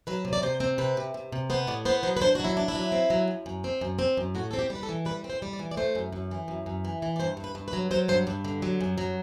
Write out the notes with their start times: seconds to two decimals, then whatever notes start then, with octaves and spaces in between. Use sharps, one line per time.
0.07 F#3 B4
0.25 C3
0.33 D5
0.43 C3 C5
0.60 C4
0.78 C3 B4
0.97 C3
1.14 C3
1.33 C3
1.50 B3 C5
1.67 A2 D5
1.85 B3 C5
2.03 F#3 C5
2.17 B4
2.21 D4 C5
2.35 F#4
2.40 F#3 E4
2.57 D4
2.68 E4
2.75 F#3
2.92 C4
3.10 F#3
3.28 F#2
3.46 F#2
3.64 C4
3.81 F#2
3.99 C4
4.17 F#2
4.35 A2 F#4
4.51 A4
4.53 C4
4.59 G4
4.70 G3
4.75 B4
4.83 A4
4.89 E3
5.05 G3 B4
5.24 C4
5.30 C5
5.42 G3
5.53 D5
5.59 E3
5.71 D5
5.77 A3 C5
5.95 F#2
6.13 F#2
6.31 E3
6.48 F#2
6.66 F#2
6.85 E3
7.02 E3
7.16 D5
7.20 G2 C5
7.37 G2
7.44 B4
7.55 G2
7.68 B4
7.73 F#3
7.91 F#3 C5
8.08 G2 C5
8.27 G2 D5
8.45 D3
8.62 F#3
8.81 F#2
8.98 F#3